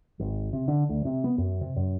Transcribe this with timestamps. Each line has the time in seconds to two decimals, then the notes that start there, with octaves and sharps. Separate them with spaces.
0.19 G#1
0.53 C3
0.68 D3
0.89 D2
1.05 C3
1.24 B3
1.38 F#2
1.61 C3
1.76 F#2